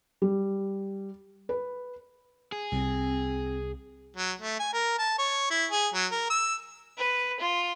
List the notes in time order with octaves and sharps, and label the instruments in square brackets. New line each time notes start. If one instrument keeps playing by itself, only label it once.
[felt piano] G3
B4
[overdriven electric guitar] G#4
[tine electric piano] C2 [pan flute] C4
[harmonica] F#3
A3
G#5
A#4
A5
C#5
E4
G#4
F#3
A#4
E6
[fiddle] B4
F4